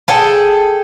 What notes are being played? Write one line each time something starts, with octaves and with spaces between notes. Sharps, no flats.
G#4 A4 G5